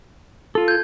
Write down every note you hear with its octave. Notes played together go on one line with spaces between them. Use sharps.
F4 A4
G6 G#6